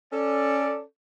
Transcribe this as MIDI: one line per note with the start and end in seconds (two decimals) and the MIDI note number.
0.13 0.82 61
0.13 0.82 69
0.13 0.82 74